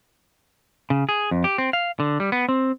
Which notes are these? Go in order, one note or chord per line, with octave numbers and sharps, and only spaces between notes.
C#3
G#4
F2
G4
C4
F5
D3
G3
B3
C4